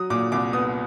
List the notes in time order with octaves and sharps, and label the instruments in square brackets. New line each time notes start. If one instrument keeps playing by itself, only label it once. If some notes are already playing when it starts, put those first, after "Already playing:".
Already playing: [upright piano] F#3 D#6
A#2 D6
C2 D6
B3 D#6